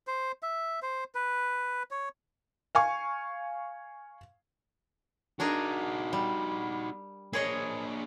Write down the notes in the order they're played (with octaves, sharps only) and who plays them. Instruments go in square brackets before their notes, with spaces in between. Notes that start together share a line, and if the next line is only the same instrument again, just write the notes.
[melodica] C5
E5
C5
B4
C#5
[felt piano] F5 G#5 C#6
[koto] D4 G#4 A#4 [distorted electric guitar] D#4 F#4
[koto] G3
[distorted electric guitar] A#3 D4 [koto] G#4 C#5 D#5